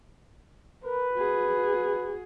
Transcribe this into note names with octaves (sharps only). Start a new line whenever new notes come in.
A#4 B4
F#4 G#4